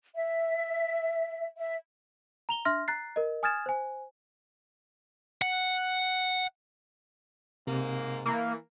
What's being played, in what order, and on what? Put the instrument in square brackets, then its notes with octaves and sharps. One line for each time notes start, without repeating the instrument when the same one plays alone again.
[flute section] E5
E5
[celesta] A#5 F7 G7
D4 E5 C6 F6 A#6
A#5 F#6 A6 C7
A#4 D#5
G#5 D#6 F6 G#6 A6 E7
C5 G#5
[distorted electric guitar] F#5
[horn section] G#2 A#3 [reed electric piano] C3
[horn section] E3 [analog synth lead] A#3